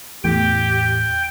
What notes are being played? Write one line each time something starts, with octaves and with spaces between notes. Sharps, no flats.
E2 A2 G4 G5